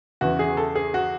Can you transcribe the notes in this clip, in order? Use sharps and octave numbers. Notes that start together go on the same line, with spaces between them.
E2 C#3 E3 F#4
G#4
A4
G#4
F#4